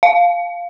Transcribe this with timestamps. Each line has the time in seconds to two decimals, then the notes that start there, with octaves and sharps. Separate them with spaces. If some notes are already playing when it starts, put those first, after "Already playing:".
0.03 F5